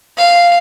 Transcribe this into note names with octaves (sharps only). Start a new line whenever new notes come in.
F5